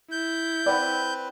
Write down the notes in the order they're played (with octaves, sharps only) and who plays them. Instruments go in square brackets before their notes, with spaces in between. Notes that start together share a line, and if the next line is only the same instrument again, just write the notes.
[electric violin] E4 [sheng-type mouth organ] G6
[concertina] C4 B4 [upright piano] D5 F#5 B5